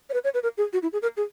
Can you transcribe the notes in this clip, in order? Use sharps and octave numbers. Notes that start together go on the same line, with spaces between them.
C#5
B4
C#5
B4
A#4
G#4
F#4
E4
G#4
A#4
G#4